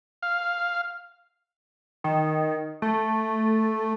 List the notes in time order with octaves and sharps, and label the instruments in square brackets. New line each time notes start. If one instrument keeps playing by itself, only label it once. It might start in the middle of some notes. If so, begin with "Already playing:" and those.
[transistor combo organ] F5
[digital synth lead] D#3
A3